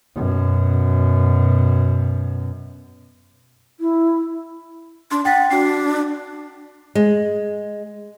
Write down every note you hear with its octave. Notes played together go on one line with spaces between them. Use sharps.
F#2 B2
E4
D4 C6
F#5 G5 A6 B6
D4 F#4 C7
G#3